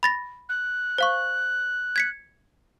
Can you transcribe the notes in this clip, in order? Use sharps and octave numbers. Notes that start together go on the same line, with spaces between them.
B5 A6 A#6
F#6
C5 F5 C#6
G#6 B6 C#7